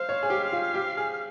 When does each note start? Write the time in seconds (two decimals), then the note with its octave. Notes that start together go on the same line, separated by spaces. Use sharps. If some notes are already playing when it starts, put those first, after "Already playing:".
Already playing: C5 F5
0.09 C#5
0.23 G#4
0.30 G4
0.52 F4
0.74 G4
0.97 G#4